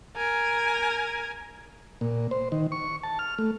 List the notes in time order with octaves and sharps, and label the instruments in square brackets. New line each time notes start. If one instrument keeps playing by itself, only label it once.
[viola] A#4 G#5
[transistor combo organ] A#2
C5
D#3
C#6
A5
F6
A3